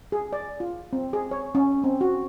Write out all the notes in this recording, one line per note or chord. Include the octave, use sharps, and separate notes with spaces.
G#4
D5
F4
C4
G#4
C#5
C#4
C4
F#4